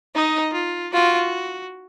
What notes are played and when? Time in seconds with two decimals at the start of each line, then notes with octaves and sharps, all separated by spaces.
0.15 D#4 D#5
0.53 F4
0.93 F4 F#4